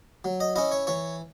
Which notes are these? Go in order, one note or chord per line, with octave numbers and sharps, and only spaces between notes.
F#3
D#5
C#4 E4 D#5
C#5
E3 C#5